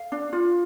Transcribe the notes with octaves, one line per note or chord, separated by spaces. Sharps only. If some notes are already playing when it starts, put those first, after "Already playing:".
Already playing: F5
D4
F4